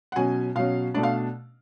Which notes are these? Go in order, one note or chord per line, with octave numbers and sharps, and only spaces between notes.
F#5
B2 F#3 C#4 G#5
B2 F#3 C#4 F5
B2 A3 D4 D5
F5